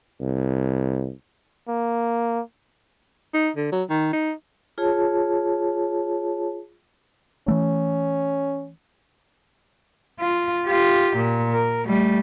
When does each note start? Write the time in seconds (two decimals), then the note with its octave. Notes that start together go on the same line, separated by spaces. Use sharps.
0.21 C2
1.69 A#3
3.34 D#4
3.56 D3
3.72 F#3
3.90 D#3
4.13 D#4
4.78 F4 G#4 C#5 A5
7.48 E3 A3 C#4
10.20 F4
10.65 F4 G4
11.17 A#2
11.53 A#4
11.87 G3 A3